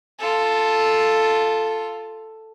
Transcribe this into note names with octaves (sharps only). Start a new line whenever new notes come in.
F4 A4